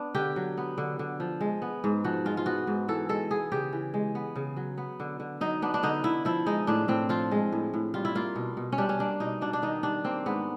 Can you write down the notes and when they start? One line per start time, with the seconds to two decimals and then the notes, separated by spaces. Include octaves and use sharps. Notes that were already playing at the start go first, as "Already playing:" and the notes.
Already playing: B3 D4
0.14 D3 G4
0.36 F#3
0.57 B3
0.78 D3
0.99 D3
1.20 F3
1.41 G#3
1.62 B3
1.84 G#2
2.04 F3 F#4
2.25 G#3 F4
2.37 F4
2.46 B3 F#4
2.67 G#2
2.88 E3 A4
3.09 G#3 A4
3.31 B3 G#4
3.52 C#3 G4
3.73 E3
3.94 G#3
4.15 B3
4.36 C#3
4.57 F#3
4.77 B3
5.00 D3
5.20 D3
5.41 F#3 D#4
5.62 B3 D4
5.74 D4
5.83 D3 D#4
6.04 D3 E4
6.25 F3 E4
6.46 G#3 D#4
6.67 A2 D4
6.88 A2 C4
7.09 F3 F4
7.31 G#3
7.52 A2
7.74 A2
7.94 G3 F4
8.05 E4
8.15 A#3 F4
8.36 B2
8.57 B2
8.72 C#4
8.78 G3 D4
8.89 C#4
8.99 A#3 D4
9.20 B2 D#4
9.41 B2 D4
9.53 D4
9.62 D#3 D#4
9.83 G3 D4
10.05 A#3 C4
10.26 G#2 B3